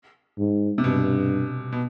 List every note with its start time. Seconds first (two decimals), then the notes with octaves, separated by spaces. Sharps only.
0.38 G#2
0.78 C3
0.84 G2 B2
1.72 B2